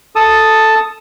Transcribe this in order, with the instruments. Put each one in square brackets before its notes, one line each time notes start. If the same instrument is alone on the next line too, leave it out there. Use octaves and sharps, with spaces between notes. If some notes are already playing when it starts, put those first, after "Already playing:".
[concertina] A4 A5 D#6